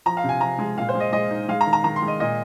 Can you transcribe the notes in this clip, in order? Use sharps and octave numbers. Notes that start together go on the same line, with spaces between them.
F3 A#5
F5
C3
G#5
F3 A#5
G#3
A#2 F5
C5
G#3
D#5
G#3 D#5
D#4
G#3 F5
A#5
D#3
A#5
D#3 A#5
C6
G#3
D#5
A#2 D#5